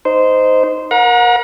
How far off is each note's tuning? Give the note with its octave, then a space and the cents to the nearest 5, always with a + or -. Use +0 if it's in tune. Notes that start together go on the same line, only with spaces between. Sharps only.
D#4 +0 C5 -15
A#4 +15 F#5 -35 A#5 +40